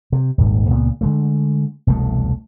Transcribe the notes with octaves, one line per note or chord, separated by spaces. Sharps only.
C3
D#1 G#1 G#2
C#2 A#2 A3 B3
D3 G#3 A3
E1 C2 B2 A3